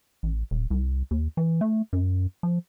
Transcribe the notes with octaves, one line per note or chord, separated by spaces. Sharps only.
A1
D#1
C2
D#2
E3
A3
F#2
F3